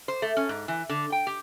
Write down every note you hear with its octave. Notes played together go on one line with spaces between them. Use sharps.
C5
A3
C#4
G#2
E3
D3
G5
G4